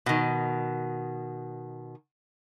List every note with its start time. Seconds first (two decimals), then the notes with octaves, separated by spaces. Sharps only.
0.06 B2 D#3